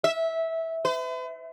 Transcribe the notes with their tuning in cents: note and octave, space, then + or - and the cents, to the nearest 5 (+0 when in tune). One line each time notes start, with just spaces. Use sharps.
E5 -15
B4 +45